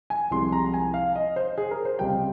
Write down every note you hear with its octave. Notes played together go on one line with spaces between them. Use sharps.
G#5
C2 C3 F3 G#3 C6
A#5
G#5
F5
D#5
C5
G#4
A#4
C5
C#2 C3 G3 G5